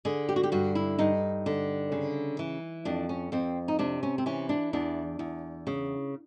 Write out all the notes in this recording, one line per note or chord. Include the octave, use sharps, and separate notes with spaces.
D3 G#4
G4
F#4
G4
G2 F#4
E4
G2 D#4
D3
C#3
E3
F2 D4
C#4
F2 C4
D#4
C3 D4
C#4
C4
E3 C#4
D4
E2 D4
E2
C#3